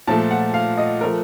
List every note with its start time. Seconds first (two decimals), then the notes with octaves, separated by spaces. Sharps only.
0.07 A#2 F3 A3 A5
0.31 F#5
0.54 F5
0.78 D#5
1.01 F3 A3 A#4